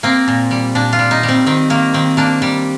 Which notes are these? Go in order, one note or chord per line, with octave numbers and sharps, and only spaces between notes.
A#3 C4
A#2
G3
A#2 D4
F4
G3
D#4
G3
C4
D#3 C4
D#3 A#3
D#3 C4
A#3 D4
G3